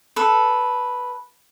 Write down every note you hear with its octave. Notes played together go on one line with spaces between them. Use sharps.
A4 B4